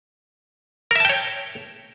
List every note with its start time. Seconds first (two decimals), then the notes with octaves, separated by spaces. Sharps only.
0.91 A#4
0.96 E5
1.00 A5
1.05 G5
1.09 C#5